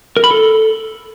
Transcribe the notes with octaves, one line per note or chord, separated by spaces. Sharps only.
A#4
B5
A4